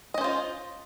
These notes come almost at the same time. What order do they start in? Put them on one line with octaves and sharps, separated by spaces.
D#5 C#4 C5 F4